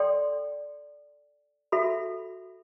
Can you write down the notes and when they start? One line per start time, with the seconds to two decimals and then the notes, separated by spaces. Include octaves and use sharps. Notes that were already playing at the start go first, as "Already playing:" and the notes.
Already playing: A4 D5 G5 C6
1.72 F#4 A4 E5 B5